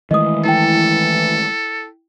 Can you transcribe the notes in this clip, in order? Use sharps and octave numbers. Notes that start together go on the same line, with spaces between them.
D#3 E3 G#3 A3 D#5 D#6
E4 A4 G5